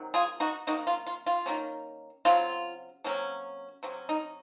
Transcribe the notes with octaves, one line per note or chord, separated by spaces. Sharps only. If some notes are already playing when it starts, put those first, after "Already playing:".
Already playing: C3 D#3 F#3
F4 G#4
D#4 F#4
C3 D#3 A#3 D#4 F#4
F4
F4
F4
D#3 A#3 C#4
C#3 F#3 C4 F4
C3 F#3 A#3 C#4
C3 F#3 C#4
D#4